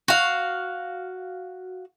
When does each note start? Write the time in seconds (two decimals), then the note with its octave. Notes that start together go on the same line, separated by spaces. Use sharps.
0.08 F#4 F5